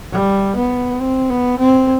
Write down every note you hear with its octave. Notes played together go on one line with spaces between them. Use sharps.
G3
B3
C4
B3
C4